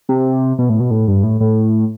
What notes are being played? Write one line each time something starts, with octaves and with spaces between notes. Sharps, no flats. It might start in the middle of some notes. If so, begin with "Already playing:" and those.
C3
B2
A2
B2
A2
G2
A2
A2